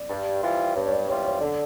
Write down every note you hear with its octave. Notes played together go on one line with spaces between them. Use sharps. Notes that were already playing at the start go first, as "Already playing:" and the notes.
Already playing: D5
G2
E3 G3 C4 F4
G2 C#5
C#5
D5
E3 G3 C4 F4 C#5
C#5
D3 D5